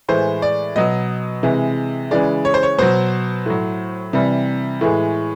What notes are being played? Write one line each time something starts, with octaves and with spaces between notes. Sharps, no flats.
A2 E3 G#3 C5
D5
B2 F#3 D#5
C3 E3 G#3
C#3 E3 G#3 D5
C#5
C5
C#5
B2 F#3 C5
A2 F#3
C3 E3 G3
A2 E3 G#3